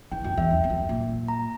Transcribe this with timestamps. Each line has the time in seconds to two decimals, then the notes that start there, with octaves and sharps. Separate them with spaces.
0.12 E3 G5
0.24 F#2 G5
0.37 E2 E5
0.50 F#2
0.64 E2
0.70 F#2
0.89 A#2
1.28 A#5